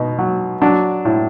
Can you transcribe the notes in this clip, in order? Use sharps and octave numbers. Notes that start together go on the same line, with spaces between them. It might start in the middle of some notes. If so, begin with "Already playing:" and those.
Already playing: B2 D#4
F#3
F#3 D4
A2